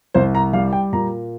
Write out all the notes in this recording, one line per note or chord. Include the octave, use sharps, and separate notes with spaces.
C2 C5
A#5
G3 F5
G5
A#2 A#5